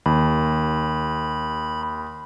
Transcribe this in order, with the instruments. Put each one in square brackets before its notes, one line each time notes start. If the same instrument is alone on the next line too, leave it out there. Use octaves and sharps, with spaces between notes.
[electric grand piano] D#2 [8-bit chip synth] B5